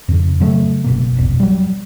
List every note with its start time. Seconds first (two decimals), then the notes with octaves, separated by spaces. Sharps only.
0.09 F2 C#3
0.40 C#3 F#3 A3
0.84 F#1 B2 A#3
1.17 F1 B1
1.40 F#3 G3